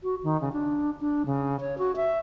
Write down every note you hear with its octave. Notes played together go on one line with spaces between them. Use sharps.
F#4
D#3
C#3
D4
D4
C#3
C#5
F#4
E5